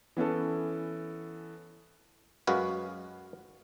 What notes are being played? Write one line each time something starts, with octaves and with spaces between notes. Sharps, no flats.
E3 B3 C#4 A4
F#2 G#3 F#4 B4 F5